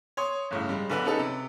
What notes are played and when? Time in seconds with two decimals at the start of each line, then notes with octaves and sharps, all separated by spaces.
0.17 C#5 C6 D#6
0.51 G1 A2 C#3
0.69 G3 G#3
0.90 B1 D3 D4 B4
1.05 C#4 D#4 G#4 A4 B4
1.19 C3